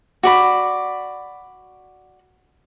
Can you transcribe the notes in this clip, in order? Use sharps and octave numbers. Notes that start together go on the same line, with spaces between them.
F#4 D5 B5